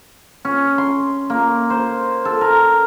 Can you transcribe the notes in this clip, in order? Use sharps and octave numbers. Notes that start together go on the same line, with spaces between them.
C#4
C6
A#3
C5
A4
A#4